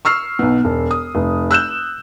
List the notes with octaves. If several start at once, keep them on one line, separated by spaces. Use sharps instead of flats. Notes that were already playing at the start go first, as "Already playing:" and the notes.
C#6 E6 F6 C7
B1 B2
E1
D#6
F1
E6 F#6 G6 E7